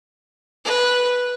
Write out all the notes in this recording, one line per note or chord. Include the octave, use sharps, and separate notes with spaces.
B4